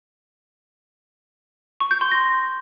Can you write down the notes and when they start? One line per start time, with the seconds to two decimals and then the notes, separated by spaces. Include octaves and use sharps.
1.80 C#6
1.91 G6
2.01 C6
2.11 A#6